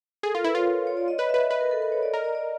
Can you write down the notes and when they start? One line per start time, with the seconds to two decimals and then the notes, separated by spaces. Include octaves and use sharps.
0.23 G#4 A4
0.34 F4 A#4
0.44 E4 B4
0.55 F4 C#5
0.87 C#5
0.97 D5
1.08 D#5
1.18 B4 D#5
1.29 E5
1.34 B4
1.39 E5
1.50 B4 D#5
1.61 A#4
1.71 A4
1.82 A#4
1.92 C#5
2.03 D5
2.13 A#4 D#5
2.24 D5
2.35 D5